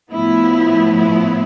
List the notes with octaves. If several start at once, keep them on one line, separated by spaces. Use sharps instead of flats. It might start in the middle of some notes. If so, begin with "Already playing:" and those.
A2 F3 B3 E4
E4